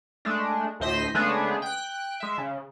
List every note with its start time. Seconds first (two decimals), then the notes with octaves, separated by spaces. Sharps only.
0.25 G#3 A3 D4
0.80 D2 A2 C5 D#5 C6 B6
1.15 C#3 G#3 A3 B3 D4 G#4
1.62 G5 F#6
2.20 G#3 E5
2.38 C#3